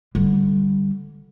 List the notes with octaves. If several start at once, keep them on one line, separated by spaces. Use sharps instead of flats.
D3 G3